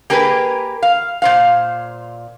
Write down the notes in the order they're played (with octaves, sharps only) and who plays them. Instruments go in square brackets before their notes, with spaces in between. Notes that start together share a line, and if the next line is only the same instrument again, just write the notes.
[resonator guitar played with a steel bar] A#3 G4 G#4 A#4 B4
F5
A#2 C5 F5